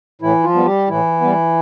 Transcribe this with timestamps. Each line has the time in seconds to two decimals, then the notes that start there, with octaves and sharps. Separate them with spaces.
0.21 A2 E3 E4
0.44 F3 F4
0.55 G3 B3
0.65 G3 G4
0.88 A2 E3 E4
1.21 G3 B3